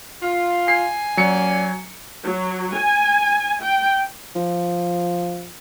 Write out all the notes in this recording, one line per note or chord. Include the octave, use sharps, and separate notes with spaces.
F4
G#5 C7
A#2 F#3 C#4 D5 C#7
F#3
G#5
G5
F3